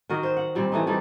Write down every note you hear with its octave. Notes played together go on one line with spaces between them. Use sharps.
D#3 F#4 A#4 D#5
C5
F#5
A#2 G3 C4
E3 A3 D#4
E3 G3 D#4 A4